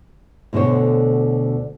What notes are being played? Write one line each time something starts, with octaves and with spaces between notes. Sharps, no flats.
D2 B2 D3 C5 C#5